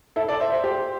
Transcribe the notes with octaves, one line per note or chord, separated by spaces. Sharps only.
E4 A4
A4 D5
C5 E5
C5 E5
G4 C5